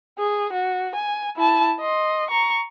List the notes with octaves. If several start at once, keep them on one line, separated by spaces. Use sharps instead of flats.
G#4
F#4
G#5
E4 A5
D#5 C6
A#5 C#6